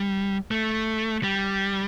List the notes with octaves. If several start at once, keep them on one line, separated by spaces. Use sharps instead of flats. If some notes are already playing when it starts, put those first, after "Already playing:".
Already playing: G3
A3
G3